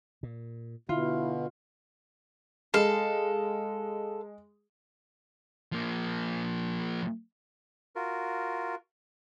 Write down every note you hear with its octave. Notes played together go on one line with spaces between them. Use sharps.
A#2
B2 D3 E4 F4
G#3 A4 F5
F3 A#3
F4 F#4 A#4